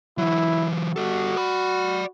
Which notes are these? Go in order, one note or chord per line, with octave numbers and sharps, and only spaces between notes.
E3 F#3 E4
G3 F#4 A4
D5 B5